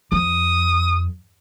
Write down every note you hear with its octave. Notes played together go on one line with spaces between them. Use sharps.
F2 D#6